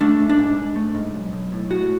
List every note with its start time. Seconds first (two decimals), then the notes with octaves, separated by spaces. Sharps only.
0.01 A3 D4
0.20 G#2
0.29 D4
0.39 G#2
0.57 G#2
0.76 A3
0.95 G#2
1.14 B1
1.33 B1
1.52 A2
1.70 A2 F#4